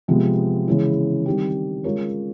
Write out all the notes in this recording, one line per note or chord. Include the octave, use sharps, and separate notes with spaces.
C3 F3 G#3 B3
C#3 E3 G#3 C#4 E4
D#3 G3 C4 D#4 G4
G#3 C#4 F4 A#4 C#5